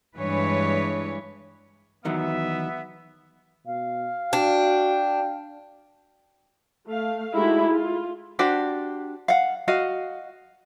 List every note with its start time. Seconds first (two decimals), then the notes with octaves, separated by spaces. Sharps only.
0.18 G2 E3 G#3 D4 B4 C#5
2.05 E2 D#3 F#3 B3 E5
3.66 B2 F5
4.33 D4 F#4 G5
6.87 A3 F5
7.34 G#3 A3 D#4 E4 F#4 G4
7.68 F4
8.39 D4 F#4 G4 C5
9.28 F5 F#5
9.68 F#4 D#5 F5